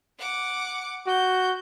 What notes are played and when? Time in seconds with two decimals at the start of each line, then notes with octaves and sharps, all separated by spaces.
0.17 F#5 D6
1.07 F#4 G6